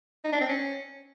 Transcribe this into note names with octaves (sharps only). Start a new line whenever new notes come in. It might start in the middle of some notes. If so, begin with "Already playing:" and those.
D#4
D4
C4
C#4